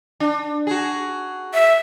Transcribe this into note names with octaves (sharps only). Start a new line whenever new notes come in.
D4
F#4 G#4
E5